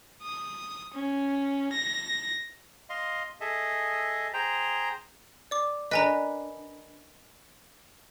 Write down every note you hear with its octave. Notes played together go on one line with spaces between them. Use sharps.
D#6
C#4
A#6
D#5 F5 C6
G#4 A4 D#5 E5
G#4 C5 G5 A#5
D5 D6
D4 A#4 B4 D#5 G#5 A#5